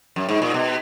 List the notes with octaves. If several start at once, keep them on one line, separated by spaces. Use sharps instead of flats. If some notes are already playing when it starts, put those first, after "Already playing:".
F#2
G#2
A#2
B2